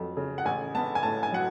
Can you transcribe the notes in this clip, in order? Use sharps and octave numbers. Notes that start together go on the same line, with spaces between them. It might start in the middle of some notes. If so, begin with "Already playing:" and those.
Already playing: F1 F2 F#3
C#3
F#5
A1 G#5
B3 A5
G#5
A2 A5
G#5
F#3 F#5